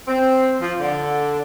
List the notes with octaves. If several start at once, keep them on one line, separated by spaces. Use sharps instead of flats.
C4
F3
D3